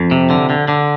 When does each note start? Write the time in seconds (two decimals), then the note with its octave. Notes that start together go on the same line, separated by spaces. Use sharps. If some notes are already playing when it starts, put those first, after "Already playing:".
Already playing: F2
0.11 C3
0.30 D3
0.50 D3
0.68 D3